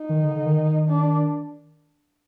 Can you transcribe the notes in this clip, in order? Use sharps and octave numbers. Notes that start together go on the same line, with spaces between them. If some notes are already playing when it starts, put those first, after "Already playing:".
Already playing: D#4
D#3
D3
D3
D#3
D4